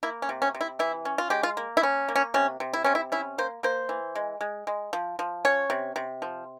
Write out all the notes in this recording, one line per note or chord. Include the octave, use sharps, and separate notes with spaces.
A#3 E4
C#4
C3
C#4
C3
E4
E3 E4
C#4
F4
G#3 G4
F4
A#3
E4
C#4
A#3
C#4
C3 C#4
C3
E4
C3 C#4
E4
C#4 E4
A#3 C5
A#3 C5
E3
G#3
G#3
G#3
F3
F3
C#4 C#5
C3
C3
F3